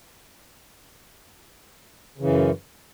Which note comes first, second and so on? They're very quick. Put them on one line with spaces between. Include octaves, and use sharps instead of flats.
C#3 E3 F#2